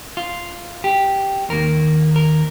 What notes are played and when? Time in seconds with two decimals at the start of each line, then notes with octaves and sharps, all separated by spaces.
0.17 F4
0.84 G4
1.49 D#2 D#3 A#3 A#4
2.16 A#4